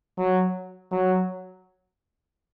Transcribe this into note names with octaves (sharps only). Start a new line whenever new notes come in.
F#3
F#3